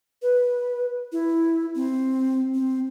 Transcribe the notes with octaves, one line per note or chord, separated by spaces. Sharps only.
B4
E4
C4
C4